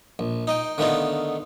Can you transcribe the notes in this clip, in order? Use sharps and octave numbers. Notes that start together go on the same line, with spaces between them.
A#1
D#4 D#5 G5
D3 D#3 A3 B3 D#4 F4